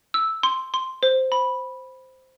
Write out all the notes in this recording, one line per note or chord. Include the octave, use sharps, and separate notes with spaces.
E6
C6
C6
C5
B5